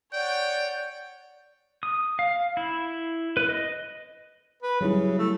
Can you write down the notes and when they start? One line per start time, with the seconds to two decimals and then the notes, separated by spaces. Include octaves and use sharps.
0.13 C#5 D5 F#5 G5
1.83 D#6
2.19 F5
2.57 E4
3.37 B4
3.49 D#5
4.62 B4
4.81 C#3 F#3 G3 E4
5.18 A3